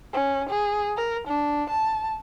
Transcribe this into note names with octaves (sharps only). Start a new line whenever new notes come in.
C#4
G#4
A#4
D4
A5